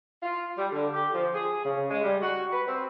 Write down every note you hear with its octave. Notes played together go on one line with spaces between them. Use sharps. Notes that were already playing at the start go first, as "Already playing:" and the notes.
F4
G3
D3
G4
F3
G#4
C#3
G#3
G3
F#4
B4
C4